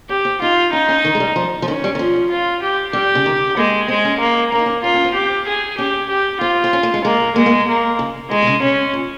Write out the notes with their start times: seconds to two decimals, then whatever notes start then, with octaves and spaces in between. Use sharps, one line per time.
0.09 C#4 G4
0.25 C4
0.41 D#4 F4
0.72 C#4 D#4
0.89 C#4
1.05 D#3
1.15 G#3
1.20 G3
1.36 F3
1.62 F3
1.68 D#3 C#4
1.84 G3
1.95 D#3
1.99 F3
2.30 F4
2.62 G4
2.93 G3 G4
3.15 C#3
3.26 D#3
3.57 G#3 A#3
3.88 G#3 C4
4.05 C#4
4.20 A#3
4.52 A#3 C#4
4.59 D#4
4.66 C#4
4.84 C#4 F4
4.94 C#4
5.05 C4
5.14 G4
5.47 G#4
5.78 C#4 G4
6.09 G4
6.41 C4 F4
6.64 C4
6.73 C#4
6.83 A#3
6.94 G#3
7.05 G#3 A#3
7.36 G#3 A#3
7.46 A#3
7.68 A#3
7.99 C#3
8.31 D#3 G#3
8.42 C3
8.47 C#3
8.62 C3 C#4
8.94 A#2